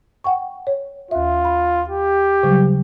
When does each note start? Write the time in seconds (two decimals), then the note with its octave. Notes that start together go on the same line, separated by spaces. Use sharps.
0.24 F#5 G5 C#6
0.67 C#5
1.11 D#2 F4 E5
1.45 B5
1.90 G4
2.43 C#3 F#3 G3